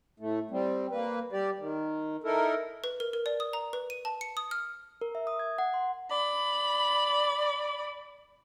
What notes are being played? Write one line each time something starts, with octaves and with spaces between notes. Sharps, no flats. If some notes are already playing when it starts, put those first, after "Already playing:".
A2 A3
G3 C4
A#3 B4
G3 G4 D5
D#3
D#4 E4 A4 A#4
B4
A#4
A#4
D5
D#6
A#5
B4
D#7
A5
C#7
D#6
F6
A#4
E5
D#6
G#6
F#5
C6
D5 B5